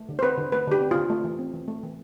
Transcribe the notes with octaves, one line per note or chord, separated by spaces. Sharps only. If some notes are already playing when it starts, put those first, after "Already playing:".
Already playing: A3
D3
C5
C4 B4
D3
A3 B4
D3 G4
C4
D3 F4
A3
E3
C4
E3
A3
E3